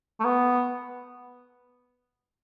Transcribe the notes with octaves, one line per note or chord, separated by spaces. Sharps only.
A3
B3